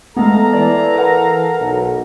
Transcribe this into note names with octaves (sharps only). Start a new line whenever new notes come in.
G#3 A3 B3 A4 F5 A#5
E3 D5
A#4 B4 F#5
B1